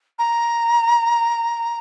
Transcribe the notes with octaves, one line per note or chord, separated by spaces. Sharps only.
A#5